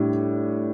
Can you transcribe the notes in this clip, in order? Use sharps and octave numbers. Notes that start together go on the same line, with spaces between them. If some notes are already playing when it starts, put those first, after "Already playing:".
Already playing: A2 G3 D4